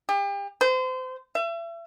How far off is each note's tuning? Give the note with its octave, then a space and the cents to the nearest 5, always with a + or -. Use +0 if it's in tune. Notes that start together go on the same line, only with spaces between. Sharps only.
G4 +35
C5 -30
E5 +35